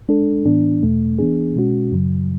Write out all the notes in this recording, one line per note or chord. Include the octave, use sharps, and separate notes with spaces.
G#3 D4 A4
A2 E3 B3 D4
E2 B2 A3
E3 B3 D4 G#4
B2 G#3 C#4 F#4
F#2 C#3 F#3